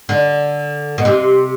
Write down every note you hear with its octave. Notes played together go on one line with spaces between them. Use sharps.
D3
B2
C3